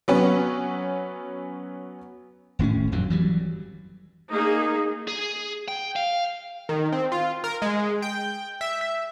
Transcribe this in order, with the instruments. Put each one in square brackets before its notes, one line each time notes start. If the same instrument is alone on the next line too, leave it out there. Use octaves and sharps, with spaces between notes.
[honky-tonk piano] F#3 B3 C#4
[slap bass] D#1 A2 A#3 C#4
G1 F2 D3 F#3
E3 F#3 G3
[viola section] A#3 D#4 G#4
[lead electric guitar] G#4
G5
F5
[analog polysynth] D#3
C4
F4
A#4
G#3
G5
E5
E5